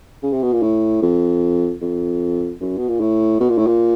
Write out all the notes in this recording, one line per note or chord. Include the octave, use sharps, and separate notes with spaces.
C#3
C3
B2
A#2
A2
F2
F2
F#2
B2
A#2
A2
B2
A#2
A2
A#2